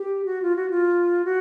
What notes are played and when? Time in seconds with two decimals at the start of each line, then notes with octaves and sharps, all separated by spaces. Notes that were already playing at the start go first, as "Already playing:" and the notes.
Already playing: G4
0.25 F#4
0.42 F4
0.56 F#4
0.70 F4
1.25 F#4